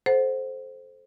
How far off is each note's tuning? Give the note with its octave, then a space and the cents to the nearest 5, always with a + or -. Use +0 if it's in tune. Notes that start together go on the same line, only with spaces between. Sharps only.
A4 -25 C5 +0 F#5 -5